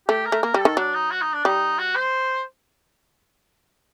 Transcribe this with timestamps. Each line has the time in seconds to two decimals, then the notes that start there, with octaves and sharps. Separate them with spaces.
0.08 A3 G4
0.25 A#4
0.32 A3
0.42 A#3 A#4
0.54 G3 A4
0.65 D#3
0.77 F#3 D4
0.94 D#4
1.11 F#4
1.22 D#4
1.33 D4
1.45 G3 D#4
1.79 F#4
1.95 C5